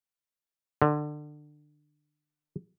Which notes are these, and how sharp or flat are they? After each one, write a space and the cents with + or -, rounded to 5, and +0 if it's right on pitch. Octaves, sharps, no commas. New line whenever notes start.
D3 +25